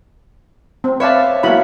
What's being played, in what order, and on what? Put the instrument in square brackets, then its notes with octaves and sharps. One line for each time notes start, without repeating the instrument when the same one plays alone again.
[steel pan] C4
[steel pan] B4 D5 A5 [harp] C#5 E5 F5
[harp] G#3 A#3 B3 [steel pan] E4 F#4 B5